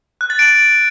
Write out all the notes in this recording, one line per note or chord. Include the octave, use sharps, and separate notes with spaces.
F#6
A6
D7